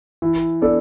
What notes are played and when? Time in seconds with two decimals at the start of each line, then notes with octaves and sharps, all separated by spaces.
0.22 E3
0.61 B3 D4 A4 D5